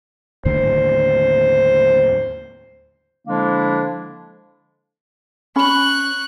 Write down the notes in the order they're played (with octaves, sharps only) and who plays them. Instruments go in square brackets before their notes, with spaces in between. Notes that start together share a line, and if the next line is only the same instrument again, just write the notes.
[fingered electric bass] D#2 A2 D3 [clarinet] C5
[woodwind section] D3 F3 G#3 A#3 D4 E4
[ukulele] C#4 B5 [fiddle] C#6 F#6